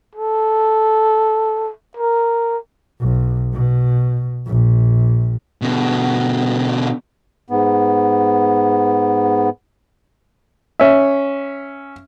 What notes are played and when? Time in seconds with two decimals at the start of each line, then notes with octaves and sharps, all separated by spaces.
0.16 A4
1.97 A#4
3.00 B1
3.53 B2
4.47 A#1
5.62 B2 D3
7.50 G#2 B3
10.80 C#4 E5